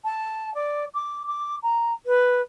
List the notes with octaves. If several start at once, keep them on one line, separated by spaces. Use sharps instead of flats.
A5
D5
D6
D6
A#5
B4